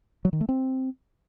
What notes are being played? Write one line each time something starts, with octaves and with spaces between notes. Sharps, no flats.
F#3
D#3
A3
C4